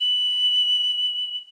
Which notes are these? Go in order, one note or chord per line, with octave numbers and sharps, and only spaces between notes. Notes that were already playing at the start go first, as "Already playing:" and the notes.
F#7